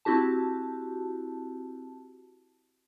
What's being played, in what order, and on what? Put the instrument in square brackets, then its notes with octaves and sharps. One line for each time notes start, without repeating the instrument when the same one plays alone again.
[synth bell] C4 E4 F#4 G4 A5